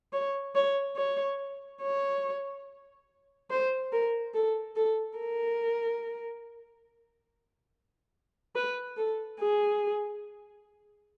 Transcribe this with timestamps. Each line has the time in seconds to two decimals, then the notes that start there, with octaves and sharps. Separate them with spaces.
0.13 C#5
0.55 C#5
0.96 C#5
1.81 C#5
3.50 C5
3.92 A#4
4.34 A4
4.76 A4
5.18 A#4
8.55 B4
8.97 A4
9.40 G#4